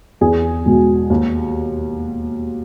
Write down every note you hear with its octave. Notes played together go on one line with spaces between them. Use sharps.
E2 G#4
B2 G#3
D#2